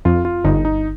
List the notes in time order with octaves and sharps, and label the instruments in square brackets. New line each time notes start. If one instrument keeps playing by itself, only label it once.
[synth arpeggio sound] F2 [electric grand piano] F4
[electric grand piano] F4
[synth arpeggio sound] G1 [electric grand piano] D#4
[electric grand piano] D#4